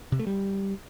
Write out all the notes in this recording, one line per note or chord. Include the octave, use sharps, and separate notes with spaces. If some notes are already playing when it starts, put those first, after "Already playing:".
C3
A3
G3